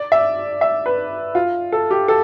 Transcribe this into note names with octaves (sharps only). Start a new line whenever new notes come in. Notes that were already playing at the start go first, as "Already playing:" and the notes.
Already playing: D5
E5
E5
B4
F4
A4
G4
A4